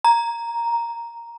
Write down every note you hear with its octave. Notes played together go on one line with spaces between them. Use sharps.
A#5